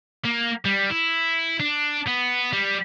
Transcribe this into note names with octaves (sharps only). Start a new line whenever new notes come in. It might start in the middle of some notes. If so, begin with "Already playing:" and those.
A#3
G3
E4
D4
B3
G3